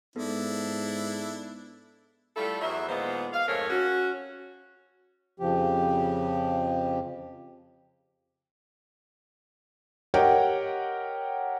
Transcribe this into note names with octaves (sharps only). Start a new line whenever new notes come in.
G#2 B3 D4 E4 A4
G3 A3 E4 F4 A4
E2 F#3 E4 E5
A#2 D#3 G#3 B3 F4 C5
F5
F2 G#2 A3 G#4 A#4 C#5
C#4 F#4
F2 C#3 F3 G4
G4 A#4 C#5 D#5 F#5 G5